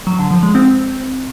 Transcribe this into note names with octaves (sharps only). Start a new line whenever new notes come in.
F#3
D3
F3
G#3
C4